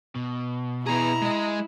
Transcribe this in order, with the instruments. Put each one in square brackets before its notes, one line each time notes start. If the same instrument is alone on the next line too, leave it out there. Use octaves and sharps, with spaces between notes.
[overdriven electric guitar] B2
[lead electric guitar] B3 G#4 [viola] E4 [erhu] A#5
[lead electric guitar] G#3 D#5